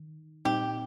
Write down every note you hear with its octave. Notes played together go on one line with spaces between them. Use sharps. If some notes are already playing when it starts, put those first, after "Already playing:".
Already playing: D#3
A#2 G3 C4 D#4 G4